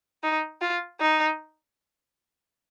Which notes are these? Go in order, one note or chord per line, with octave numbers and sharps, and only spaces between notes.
D#4
F4
D#4